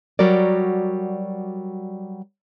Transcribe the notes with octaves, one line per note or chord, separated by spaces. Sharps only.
F#3 G3 F#4 A#4 D5